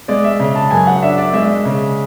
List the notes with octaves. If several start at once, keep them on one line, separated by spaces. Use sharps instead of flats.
G#3 D5
E5
C#3
A5
F#2 G#5
F#5
D4 E5
D5
G#3 E5
C#3